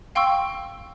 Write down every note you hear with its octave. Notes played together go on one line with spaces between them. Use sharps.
F5 G5 C6 C#6 E6